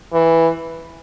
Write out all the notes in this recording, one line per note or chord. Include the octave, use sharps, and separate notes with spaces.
E3